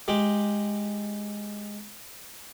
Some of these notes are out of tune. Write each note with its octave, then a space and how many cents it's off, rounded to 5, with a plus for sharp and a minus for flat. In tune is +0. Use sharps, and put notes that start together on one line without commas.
G#3 +0 G4 +0